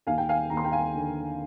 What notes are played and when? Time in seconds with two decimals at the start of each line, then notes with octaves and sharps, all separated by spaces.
0.07 D#2 F5 G#5
0.18 G5
0.29 F5 G#5
0.50 D#2 A#5
0.57 C6
0.64 G5 A#5
0.72 F5 G#5
0.94 D3